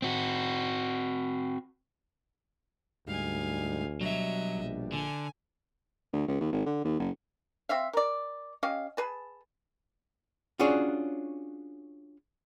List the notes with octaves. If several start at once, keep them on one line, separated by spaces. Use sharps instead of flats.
C4 F#4
D2 G#2 G3 D#4 F5 G#5
B2 F#3 G3 D4 D#5 E5
A#1
D3 G#5
D2
C#2
D#2
G#1
D3
D#2
F#1
C4 C5 E5 F5
A#4 D5
C#4 G4 D#5 F5
G#4 B4 A5
C#4 D4 F4 F#4 G#4 C#5